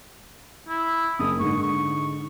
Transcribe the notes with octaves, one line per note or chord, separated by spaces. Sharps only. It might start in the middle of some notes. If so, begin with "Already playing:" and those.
E4
F#1 D#6
G#2 D3 C#6
C#6